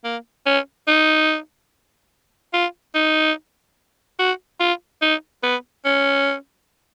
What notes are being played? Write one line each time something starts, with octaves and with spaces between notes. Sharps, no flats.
A#3
C#4
D#4
F4
D#4
F#4
F4
D#4
B3
C#4